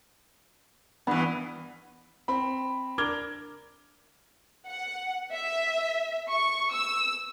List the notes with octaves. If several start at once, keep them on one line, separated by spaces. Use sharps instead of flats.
G2 E3 B3
C4 B5
D4 A#4 D6 F6 G#6 G7
F#5
E5
C#6
E6